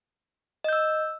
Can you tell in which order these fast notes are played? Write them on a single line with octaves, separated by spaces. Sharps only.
D#5 G6 E6